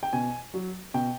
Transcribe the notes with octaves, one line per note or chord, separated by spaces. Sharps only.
G5
B2 G#5
F#3
B2 G5